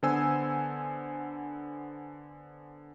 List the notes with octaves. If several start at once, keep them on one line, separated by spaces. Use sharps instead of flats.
D3 B3 C5 G#5 E6